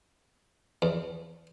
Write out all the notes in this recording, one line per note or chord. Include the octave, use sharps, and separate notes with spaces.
E2